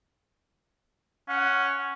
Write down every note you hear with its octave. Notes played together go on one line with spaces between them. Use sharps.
C#4 F#5